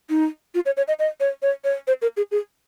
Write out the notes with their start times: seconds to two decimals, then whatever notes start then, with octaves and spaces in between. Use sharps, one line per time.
0.10 D#4
0.55 F4
0.66 C#5
0.77 C#5
0.88 D#5
0.99 D#5
1.20 C#5
1.42 C#5
1.64 C#5
1.87 C5
2.02 A#4
2.17 G#4
2.31 G#4